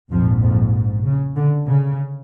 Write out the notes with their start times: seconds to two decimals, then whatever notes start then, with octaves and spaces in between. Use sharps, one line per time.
0.11 A#1 F2 G#2 F3
0.43 F2 F3
1.05 C#3
1.36 D3
1.68 C#3